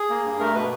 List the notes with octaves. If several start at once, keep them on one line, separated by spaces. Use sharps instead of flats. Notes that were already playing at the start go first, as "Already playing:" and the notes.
Already playing: G#4
A#3
G2
A3 A#4
B2 B4